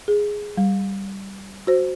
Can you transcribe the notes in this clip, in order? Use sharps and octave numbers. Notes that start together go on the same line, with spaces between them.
G#4
G3
F#4 C5